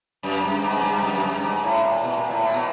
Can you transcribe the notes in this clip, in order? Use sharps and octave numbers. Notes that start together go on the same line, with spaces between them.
F#2
G2
G#2
F#2
G2
F#2
F#2
G2
G#2
A2
A#2
B2
A#2
A2
A#2
B2